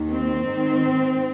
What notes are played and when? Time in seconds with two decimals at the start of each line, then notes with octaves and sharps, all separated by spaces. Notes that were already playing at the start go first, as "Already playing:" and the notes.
Already playing: D#2 D#3
0.11 C4
0.45 G#2 D#3